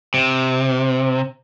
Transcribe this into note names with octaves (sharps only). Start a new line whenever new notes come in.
C3